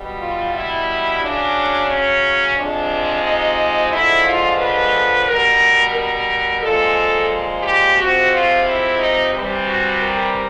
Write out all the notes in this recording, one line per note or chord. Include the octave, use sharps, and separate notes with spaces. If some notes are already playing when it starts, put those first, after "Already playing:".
Already playing: B2 G3
F4
E4
C#3 F#3 D4
C#4
C3 F3 G#3 D4
D#4
D3 F3 G#3 E4
F4
B4
B2 G3 A#4
A#4
A#2 F3 G#3 A4
G4
C3 F3 G#3 F#4
F4
E4
D#4
C3 E3 G3
F#4
A#4